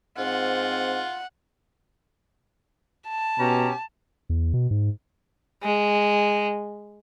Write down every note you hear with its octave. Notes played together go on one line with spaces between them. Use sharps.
G#2 C4 F4 F#5
A5
B2 C#4 G4 A#5
E2
B2
G#2
G#3